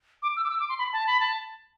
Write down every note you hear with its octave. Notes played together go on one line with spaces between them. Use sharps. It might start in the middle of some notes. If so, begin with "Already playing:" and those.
D6
E6
D6
E6
D6
C6
B5
A5
B5
A5